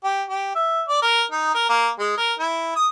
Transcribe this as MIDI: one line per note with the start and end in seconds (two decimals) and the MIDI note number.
0.04 0.24 67
0.29 0.53 67
0.55 0.82 76
0.88 1.02 74
1.02 1.24 70
1.31 1.51 63
1.54 1.67 70
1.69 1.89 58
1.99 2.13 56
2.18 2.33 70
2.39 2.74 64
2.76 2.87 87